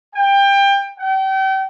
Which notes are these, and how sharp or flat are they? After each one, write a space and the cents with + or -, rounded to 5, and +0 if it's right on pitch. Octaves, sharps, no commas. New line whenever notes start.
G5 +25
G5 -35